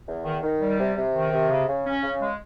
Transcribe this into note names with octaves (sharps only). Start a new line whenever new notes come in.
E2
D#3
D#3
G3
C3
C3
D#3
C3
C#3
C#3
C#4
C#3
G#3